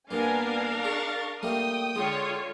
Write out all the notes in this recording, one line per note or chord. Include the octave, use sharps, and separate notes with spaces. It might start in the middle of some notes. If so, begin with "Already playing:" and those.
G2 A#3 B3 D4 A#4 F5 G#5
G#4 C#6 A6
G3 A3 A#3 G5 D#6
D3 G#3 F4 C#5